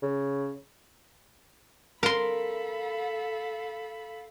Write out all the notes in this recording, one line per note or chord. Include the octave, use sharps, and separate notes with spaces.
C#3
A4 A#4 F5 B5 C6